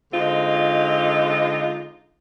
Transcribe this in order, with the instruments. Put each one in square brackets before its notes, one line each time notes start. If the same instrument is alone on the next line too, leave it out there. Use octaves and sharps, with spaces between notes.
[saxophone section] D3 G#3 C4 D#4 F4